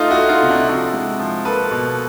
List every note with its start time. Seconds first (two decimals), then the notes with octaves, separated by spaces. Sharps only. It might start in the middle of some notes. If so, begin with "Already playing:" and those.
Already playing: A3 D#4 F4
0.10 E4 F#4
0.17 A3
0.29 D#4 F4
0.43 C3
0.49 D4 E4
0.68 F3 E4 F#4
0.94 G#3
1.19 F3
1.45 A#3 A4 B4
1.71 B2